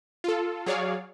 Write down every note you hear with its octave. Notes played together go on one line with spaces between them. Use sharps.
F4 A4
F#3 G#4 C#5 D5 F5